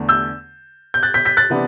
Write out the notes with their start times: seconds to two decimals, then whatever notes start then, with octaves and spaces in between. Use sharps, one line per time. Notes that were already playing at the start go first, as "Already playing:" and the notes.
Already playing: E2 D3 A3
0.09 E6 G6
0.94 G6
1.03 F#6 A6
1.14 G6 B6
1.25 G6 B6
1.37 F#6 A6
1.50 C3 E3 B3 D4